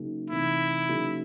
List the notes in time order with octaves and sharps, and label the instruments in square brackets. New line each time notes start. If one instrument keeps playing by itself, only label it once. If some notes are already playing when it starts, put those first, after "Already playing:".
Already playing: [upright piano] C#3 F#3 A#3 D#4 G#4
[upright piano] C3 E3 A3 C4 D#4 [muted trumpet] E4
[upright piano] C#3 F#3 A#3 D#4 G#4